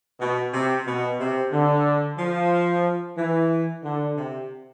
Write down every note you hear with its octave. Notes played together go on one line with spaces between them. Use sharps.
B2
C3
B2
C3
D3
F3
E3
D3
C3